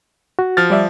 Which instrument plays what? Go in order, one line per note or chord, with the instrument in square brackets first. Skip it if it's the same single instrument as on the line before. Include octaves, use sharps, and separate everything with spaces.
[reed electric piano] F#4
[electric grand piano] F3 F6 A6
[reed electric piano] G3 D5 E5